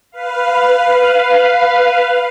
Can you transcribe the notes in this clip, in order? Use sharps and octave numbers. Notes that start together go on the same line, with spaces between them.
B4 F5